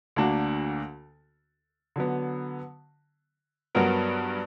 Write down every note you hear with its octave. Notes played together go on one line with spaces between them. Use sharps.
D2 D3 A#3 D4 F#4
D3 F#3 B3
G2 F#3 B3 F#4 A#4